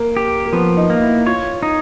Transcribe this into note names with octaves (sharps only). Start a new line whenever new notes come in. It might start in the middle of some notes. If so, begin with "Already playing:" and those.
Already playing: A#3
G4
A#3
F3 B3
D#4
A#3
E4
F4 C#5
D#4